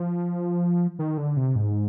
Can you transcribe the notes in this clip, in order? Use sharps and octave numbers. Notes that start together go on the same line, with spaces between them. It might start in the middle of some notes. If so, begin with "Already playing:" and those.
Already playing: F3
D#3
D3
C3
G#2